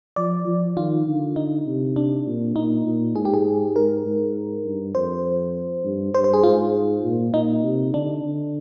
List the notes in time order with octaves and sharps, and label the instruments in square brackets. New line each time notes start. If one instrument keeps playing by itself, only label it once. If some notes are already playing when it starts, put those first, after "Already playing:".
[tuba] F3 [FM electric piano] D5
[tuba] F3
[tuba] D#3 [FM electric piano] F4
[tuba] D3
[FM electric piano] D#4
[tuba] C3
[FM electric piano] D4
[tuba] A#2
[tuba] A#2 [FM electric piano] D#4
[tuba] A#2
[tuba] G#2 [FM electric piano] G#4
[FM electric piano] G4
G#4
[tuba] G#2 [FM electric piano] A#4
[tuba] G#2
G2
[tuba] F2 [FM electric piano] C5
[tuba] G2
[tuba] G2 [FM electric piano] C5
[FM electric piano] C5
G#4
[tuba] G#2 [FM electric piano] F4
[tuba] A#2
[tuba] A#2 [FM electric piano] D#4
[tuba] C3
[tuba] D3 [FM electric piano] D4
[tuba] D3